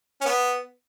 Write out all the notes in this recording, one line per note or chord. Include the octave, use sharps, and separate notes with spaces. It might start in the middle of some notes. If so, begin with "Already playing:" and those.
C#4
B3